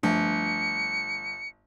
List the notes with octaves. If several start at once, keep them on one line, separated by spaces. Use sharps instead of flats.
G1 F3 A3 D4 C#7